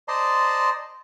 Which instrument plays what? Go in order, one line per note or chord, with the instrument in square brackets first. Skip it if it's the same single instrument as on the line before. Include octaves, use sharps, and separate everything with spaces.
[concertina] C5 D5 D#5 A5 A#5 C6